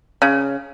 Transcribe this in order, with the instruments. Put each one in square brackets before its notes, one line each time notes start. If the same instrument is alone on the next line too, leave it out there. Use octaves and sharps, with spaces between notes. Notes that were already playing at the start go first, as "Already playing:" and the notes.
[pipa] C#3